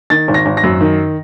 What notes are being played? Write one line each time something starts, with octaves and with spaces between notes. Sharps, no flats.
D#3 A6
G#1
A#6
G#1
A#6
F#2
D#3